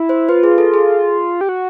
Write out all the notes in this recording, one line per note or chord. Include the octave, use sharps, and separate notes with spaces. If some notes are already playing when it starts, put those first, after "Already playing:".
Already playing: E4
C5
F4 B4
G#4
A4
G#4
G4
F#4